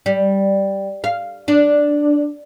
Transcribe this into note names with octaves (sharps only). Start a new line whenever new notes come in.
G3
F5
D4